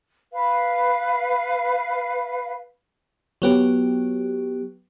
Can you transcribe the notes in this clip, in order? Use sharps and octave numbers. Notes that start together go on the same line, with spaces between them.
B4 F5
F#3 B3 G4